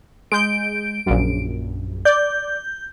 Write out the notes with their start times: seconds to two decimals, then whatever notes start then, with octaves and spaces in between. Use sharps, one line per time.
0.32 G#3 G6 D7
1.06 A#1 F#2
2.05 D5 G6